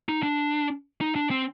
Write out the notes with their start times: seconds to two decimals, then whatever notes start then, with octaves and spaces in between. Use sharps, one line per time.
0.09 D#4
0.23 D4
1.01 D#4
1.16 D4
1.31 C4